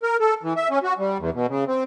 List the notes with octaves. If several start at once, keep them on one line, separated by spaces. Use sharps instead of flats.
A#4
A4
E3
E5
C#4
F#4
G3
E2
B2
C#3
C4